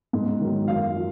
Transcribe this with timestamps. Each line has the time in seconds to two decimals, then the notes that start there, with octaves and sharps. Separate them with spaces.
0.13 G#2
0.41 D#3 F#3
0.68 F#2 F5
0.96 F3